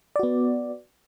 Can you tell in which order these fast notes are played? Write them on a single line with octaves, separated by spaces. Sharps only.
D5 F#4 B3